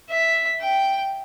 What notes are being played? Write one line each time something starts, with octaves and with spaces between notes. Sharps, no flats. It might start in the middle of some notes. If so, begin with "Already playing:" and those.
E5
G5